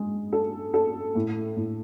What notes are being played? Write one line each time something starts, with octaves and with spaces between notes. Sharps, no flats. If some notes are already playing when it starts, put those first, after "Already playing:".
Already playing: G#3
A4
A4
A2
A2